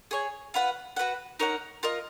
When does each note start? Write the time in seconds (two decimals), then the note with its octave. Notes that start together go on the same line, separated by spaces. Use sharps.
0.11 G#4 C#5 G#5
0.54 F4 B4 F#5
0.96 F#4 B4 F#5
1.39 D#4 A#4 C#5 F#5
1.83 F4 A#4 D#5